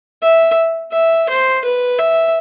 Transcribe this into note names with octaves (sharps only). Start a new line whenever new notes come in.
E5
E5
C5
B4
E5